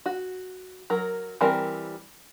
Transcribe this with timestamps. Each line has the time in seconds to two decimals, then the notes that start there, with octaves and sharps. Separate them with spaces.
0.06 F#4
0.90 F#3 A#4
1.41 E3 G3 C4 A#4